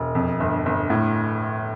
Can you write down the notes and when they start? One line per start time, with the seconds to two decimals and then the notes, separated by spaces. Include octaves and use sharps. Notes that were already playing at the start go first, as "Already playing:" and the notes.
Already playing: E1
0.15 F2
0.40 G1
0.66 G1
0.90 A2